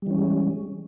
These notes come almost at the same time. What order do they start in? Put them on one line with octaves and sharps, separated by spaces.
G3 E3 C#4 G#3